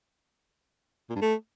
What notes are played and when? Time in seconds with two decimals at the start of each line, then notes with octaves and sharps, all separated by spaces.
1.09 A#2
1.15 G2
1.21 A3